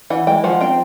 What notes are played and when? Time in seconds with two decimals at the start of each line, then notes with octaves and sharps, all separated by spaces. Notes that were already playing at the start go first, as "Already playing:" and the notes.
0.10 E3 F#5
0.27 G#3 G5
0.44 F3 F#5
0.61 C4 G5